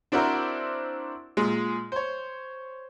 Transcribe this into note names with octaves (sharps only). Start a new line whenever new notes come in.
C4 D4 E4 F#4 A#4 C5
A#2 G#3
C5 C#5